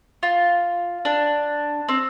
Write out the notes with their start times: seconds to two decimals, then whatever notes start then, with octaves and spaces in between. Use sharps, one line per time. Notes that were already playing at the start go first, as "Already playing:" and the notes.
0.23 F4
1.05 D4
1.88 C4